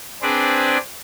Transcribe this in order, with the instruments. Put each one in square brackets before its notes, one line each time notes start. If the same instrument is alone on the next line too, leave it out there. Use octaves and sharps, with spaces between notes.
[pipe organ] C4 D4 G#4 B4 C5 D5